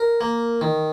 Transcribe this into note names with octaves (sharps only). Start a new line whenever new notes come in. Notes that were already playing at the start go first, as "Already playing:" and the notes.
Already playing: A#4
A#3
D#3